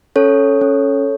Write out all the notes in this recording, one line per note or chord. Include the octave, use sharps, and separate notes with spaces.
C#4 A4 C#5
C#4